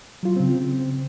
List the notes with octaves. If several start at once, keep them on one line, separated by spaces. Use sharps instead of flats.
F#3 F4
C#3 C4